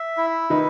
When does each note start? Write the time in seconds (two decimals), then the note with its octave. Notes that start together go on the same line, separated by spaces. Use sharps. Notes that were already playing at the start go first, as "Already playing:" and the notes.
Already playing: E5
0.17 E4
0.50 D#3 D#4 B4